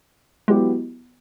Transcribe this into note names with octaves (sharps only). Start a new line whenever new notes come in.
F#3 G#3 B3 E4 G4